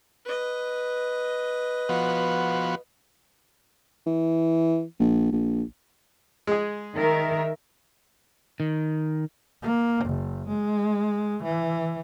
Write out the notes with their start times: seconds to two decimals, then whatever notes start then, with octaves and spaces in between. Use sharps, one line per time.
0.25 B4 D#5
1.89 F3 B3 F#4
4.07 E3
5.00 A#1
5.32 A#1
6.47 G#3 G#4
6.94 D#3 A#4 E5
8.60 D#3
9.62 A#3
10.05 F#1
10.48 G#3
11.43 E3